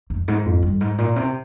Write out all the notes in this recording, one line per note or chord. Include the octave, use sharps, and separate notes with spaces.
F2
G#2
F2
G2
G#2
A#2
C3